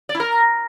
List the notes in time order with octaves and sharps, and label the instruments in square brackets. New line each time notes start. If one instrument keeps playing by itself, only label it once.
[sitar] D5
E4
A#4